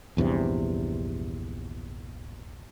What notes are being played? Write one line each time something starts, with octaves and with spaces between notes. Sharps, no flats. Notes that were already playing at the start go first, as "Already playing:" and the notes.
A#1 E2 G2 C3